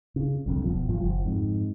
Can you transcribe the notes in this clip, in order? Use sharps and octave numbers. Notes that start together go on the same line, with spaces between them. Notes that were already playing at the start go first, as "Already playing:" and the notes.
C#3
C2 F2 D3
E1 B2 F3
G#1 G2 F3
F#1 F3
F2 G#2